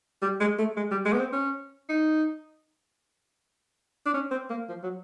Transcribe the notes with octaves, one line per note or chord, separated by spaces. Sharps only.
G3
G#3
A3
G#3
G3
G#3
B3
C4
C#4
D#4
D4
C#4
C4
A#3
F3
F#3